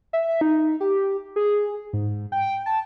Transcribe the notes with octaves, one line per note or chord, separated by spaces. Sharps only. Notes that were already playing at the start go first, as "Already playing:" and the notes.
E5
D#4
G4
G#4
G#2
G5
A5